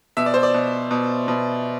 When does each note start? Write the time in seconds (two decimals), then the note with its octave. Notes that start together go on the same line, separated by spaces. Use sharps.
0.17 B2 E5
0.26 D5
0.34 C5
0.43 D5
0.54 B2
0.91 B2
1.28 B2